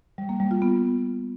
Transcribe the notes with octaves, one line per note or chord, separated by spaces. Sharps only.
G3
A#3
G3
F4
B3